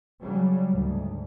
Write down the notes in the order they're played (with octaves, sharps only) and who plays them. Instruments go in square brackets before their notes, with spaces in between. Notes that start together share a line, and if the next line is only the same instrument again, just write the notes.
[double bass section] C#3 F#3 G3
D2 G#2